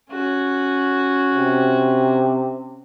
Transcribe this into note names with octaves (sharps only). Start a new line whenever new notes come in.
C#4 F#4
C3